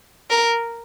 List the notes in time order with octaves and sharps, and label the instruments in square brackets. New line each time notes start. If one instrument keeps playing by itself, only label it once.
[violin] A#4